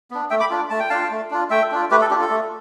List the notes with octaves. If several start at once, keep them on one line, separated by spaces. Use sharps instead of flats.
B3 D4
A3 E5 G5
B5 D6
D4 F4
A3 A5
G5
D4 F4 F5 A5
A3
D4 F4
A3 E5 G5
D4 F4
A3 G4 B4
A4
D4 F4 G4
A4
A3